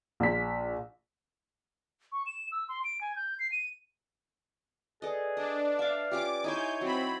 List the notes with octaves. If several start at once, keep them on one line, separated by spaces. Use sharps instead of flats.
A#1 B6
C#6
E7
E6
C6
D7
G#5
G6
C7
D#7
G#4 A4 B4 D5 D#5
D4 D#5
E5 F5 D6
C#4 F4 G4 D6
D#4 E4 C5 C#5 G#5 G6
F#3 C4 B5